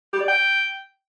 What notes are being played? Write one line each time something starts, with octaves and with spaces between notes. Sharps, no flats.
G4
D5
G5